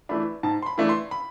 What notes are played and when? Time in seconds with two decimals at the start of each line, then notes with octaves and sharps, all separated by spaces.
0.09 E3 A3 D4 B5
0.43 G#2 A5
0.63 C6
0.66 B5
0.78 E3 A3 D4
0.89 C6
1.11 B5